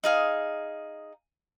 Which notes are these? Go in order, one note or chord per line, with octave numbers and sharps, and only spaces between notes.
D#4 G#4 F5